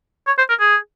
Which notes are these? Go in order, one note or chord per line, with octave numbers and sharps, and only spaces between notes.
C#5
C5
A#4
G#4